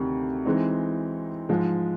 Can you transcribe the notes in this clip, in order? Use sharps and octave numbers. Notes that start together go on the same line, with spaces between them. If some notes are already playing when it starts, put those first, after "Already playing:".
Already playing: D2 C3 D#3
E3 G#3 C4 D#4
G#2 F3 G#3